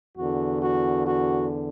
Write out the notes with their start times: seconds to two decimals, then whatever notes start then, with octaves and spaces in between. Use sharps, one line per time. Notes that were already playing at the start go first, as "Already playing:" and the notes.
0.17 E2 D3 F#4
0.62 F#4
1.06 F#4